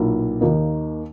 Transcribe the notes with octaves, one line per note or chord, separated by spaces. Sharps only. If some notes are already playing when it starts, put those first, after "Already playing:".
Already playing: B1 A#2 A#3 E4
D#2 D#3 A#3 D#4